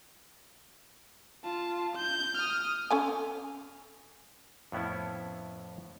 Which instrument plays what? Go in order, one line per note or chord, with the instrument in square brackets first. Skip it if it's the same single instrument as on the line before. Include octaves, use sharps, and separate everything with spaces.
[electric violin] F4 A5
G6
D#6 F6
[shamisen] C#4 A4 G#5
[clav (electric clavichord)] F2 A2 B3 C#4 E4